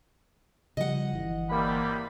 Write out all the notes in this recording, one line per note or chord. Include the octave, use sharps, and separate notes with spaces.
C#3 F3 G3 D#5 F#5
G1 E3
C#2 C3 G3 A#3 B5